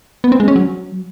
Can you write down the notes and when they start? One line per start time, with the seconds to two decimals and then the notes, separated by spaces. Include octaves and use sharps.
0.24 B3
0.32 C4
0.40 G#3
0.48 C#4
0.56 F#3